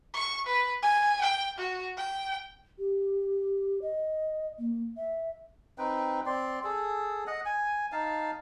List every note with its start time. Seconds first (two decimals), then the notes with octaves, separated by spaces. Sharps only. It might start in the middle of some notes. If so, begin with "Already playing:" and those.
0.14 C#6
0.47 B4
0.83 G#5
1.22 G5
1.58 F#4
1.98 G5
2.79 G4
3.82 D#5
4.59 A#3
4.97 E5
5.78 C4 D#4 B4 G5
6.26 C4 D5 C6
6.64 G#4 A4
7.27 D#5 F#5
7.46 G#5
7.92 D#4 F5 A5